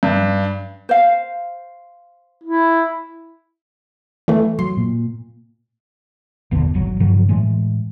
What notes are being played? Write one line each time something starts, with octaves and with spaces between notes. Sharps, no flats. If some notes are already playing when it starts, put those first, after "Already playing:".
G2
C5 F5
E4
E3 A3
F#3 C6
A#2
F#1 E2 B2 D3
D#1 G#1 F#3
G2 C#3 F3 F#3
A2 E3 G#3